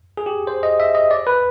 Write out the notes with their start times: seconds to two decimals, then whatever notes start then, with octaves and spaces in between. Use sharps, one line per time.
0.17 G#4
0.26 G4
0.47 C5
0.63 D#5
0.80 E5
0.95 D#5
1.11 D5
1.27 B4